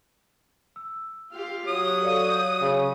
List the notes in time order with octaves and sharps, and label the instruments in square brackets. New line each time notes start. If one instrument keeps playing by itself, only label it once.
[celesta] E6
[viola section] F4 G4 F5
[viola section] F#3 [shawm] D#6
[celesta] A4 D5 F5
G6
[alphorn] C#3